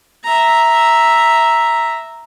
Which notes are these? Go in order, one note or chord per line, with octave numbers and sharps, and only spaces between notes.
E5 A#5